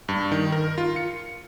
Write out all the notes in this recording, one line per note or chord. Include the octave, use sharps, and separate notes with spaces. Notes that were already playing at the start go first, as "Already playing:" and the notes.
G2
D#3
A#4
F4
C#7